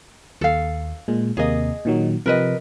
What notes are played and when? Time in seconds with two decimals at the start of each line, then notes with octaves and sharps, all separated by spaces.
0.41 D#2 A4 F5
1.08 A#2 G#3
1.37 D#2 C3 A#3 G#4 D#5
1.85 A#2 D#3 F#3
2.26 C3 F3 C4 A#4 B4 D#5